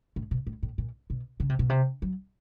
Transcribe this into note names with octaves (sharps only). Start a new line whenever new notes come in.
A2
B2
A2
A2
A#2
B2
C#3
C3
B2
C3
F#3